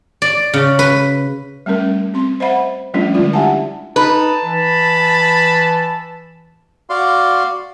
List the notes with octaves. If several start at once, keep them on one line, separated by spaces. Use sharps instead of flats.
D5
C#3
B4
G3 A3 C#4 A#4
C4 C6
C5 D#5 E5 F#5 B5
F3 G3 A3 C#4 D4 F4
D3 G#3 E4 F4 D5
D4 G4 E5 F#5 G#5 A5
D#4 B4 A5
E3 B5
F#4 D5 F5 C6